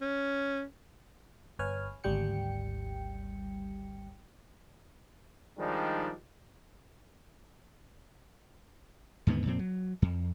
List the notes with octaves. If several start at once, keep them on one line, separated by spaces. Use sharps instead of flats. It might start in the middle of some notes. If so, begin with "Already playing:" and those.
C#4
G1 B4 C#5 G#5 F6
G#1 D2 G3 G5 C#7
D#3 F3 G3 G#3 D4 D#4
D#2 G#2 D3 B3
F2 A#2 C4
F#3
F2